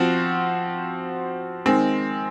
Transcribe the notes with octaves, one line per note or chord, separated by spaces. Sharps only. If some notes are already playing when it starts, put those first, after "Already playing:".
Already playing: F3 C4 F#4
D#3 G#3 C4